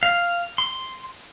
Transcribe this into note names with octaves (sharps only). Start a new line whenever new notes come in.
F5
C6